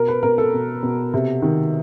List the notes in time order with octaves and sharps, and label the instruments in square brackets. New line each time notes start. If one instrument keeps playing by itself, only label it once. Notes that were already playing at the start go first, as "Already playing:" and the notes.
Already playing: [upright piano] B2 A#4
B4
B2 A#4
A4
B2
B2
C3
D#3